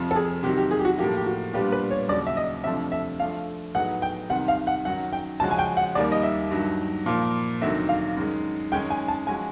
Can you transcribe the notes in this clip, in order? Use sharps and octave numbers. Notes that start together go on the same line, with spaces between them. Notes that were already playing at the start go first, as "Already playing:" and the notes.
Already playing: F2 C3 F3
A4
G#4
C3 D#3 F#3 G4
G4
G#4
G4
F#4
A2 F3 A#3 G4
G4
F#4
A#2 G3 B3 D4 F4 G4
B4
C#5
D#2 C#3 F#3 D5
E5
D#5
F2 C3 F3 A3 D4 E5
E5
F3 A3 D4 F5
A2 F#3 B3 D#4 G#4 F#5
G5
C2 C3 D#3 F#5
F5
F#5
F#2 D#3 F#3 F#5
G5
C#3 F3 G#3 C#4 F#4 A5
G#5
G5
F#5
D#2 D#3 G3 A#3 D5
D#5
E5
G2 D#3 F#3
A#2 F3 A#3
D2 C3 D#3 F#3 E5
F5
F#2 D#3 G#3
F#2 D#3 G#3 C#4 G5
G#5
A5
F3 G#3 C#4 F#4 G#5